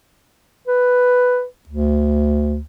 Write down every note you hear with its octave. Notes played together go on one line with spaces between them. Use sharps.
B4
D2